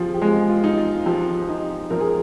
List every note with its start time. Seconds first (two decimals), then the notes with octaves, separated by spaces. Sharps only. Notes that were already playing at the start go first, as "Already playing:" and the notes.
Already playing: F3 F4 G4 G#4
0.14 G4
0.22 G#3 F4
0.49 F4
0.64 D#4
0.78 F4
1.05 F3 G4
1.48 D#4
1.90 F3 A#4
2.01 G#4